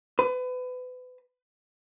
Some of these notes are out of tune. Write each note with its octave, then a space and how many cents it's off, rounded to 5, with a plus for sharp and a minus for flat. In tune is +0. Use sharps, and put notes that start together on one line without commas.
B4 +30